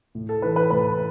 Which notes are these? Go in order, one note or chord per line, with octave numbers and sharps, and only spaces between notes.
A2
A4
E3 B4
B4
A2 B4